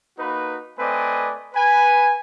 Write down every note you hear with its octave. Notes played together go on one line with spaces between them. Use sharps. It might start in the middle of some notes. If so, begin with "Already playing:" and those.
A#3 D#4 F#4 B4
A3 C4 B4 D5 D#5 G#5
B4 G#5